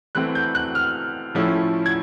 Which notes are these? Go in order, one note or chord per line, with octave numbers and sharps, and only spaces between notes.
E3 A3 C4 F#6
G6
F#6
F6
A2 F3 A3 C#4 E4
G#6